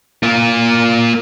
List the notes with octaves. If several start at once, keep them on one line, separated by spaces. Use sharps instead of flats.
A#3 F4